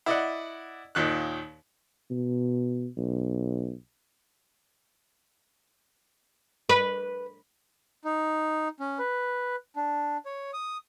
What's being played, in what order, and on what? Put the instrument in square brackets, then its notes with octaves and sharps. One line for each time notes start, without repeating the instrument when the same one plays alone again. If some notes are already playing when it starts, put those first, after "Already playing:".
[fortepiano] E4 D5 D#5 F#5
D#2 A#2 D#3 F#6
[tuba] B2
B1
[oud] B4
[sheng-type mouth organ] D#4
C#4
B4
D4
C#5
D#6